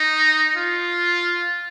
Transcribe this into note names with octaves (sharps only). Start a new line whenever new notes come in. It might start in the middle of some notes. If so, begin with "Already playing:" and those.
Already playing: D#4
F4